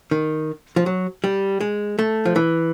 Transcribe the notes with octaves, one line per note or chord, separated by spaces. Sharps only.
D#3
F3
F#3
G3
G#3
A3
F3
E3